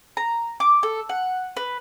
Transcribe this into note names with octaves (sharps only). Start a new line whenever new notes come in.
A#5
D6
A4
F#5
B4